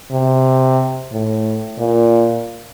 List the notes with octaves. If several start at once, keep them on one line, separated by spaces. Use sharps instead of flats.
C3
A2
A#2